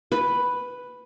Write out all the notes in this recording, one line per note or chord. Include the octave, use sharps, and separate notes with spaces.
B4